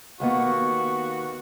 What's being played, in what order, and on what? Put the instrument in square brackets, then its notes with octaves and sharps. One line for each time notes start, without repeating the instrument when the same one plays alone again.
[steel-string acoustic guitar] D#2 A#3 B3 [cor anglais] F#4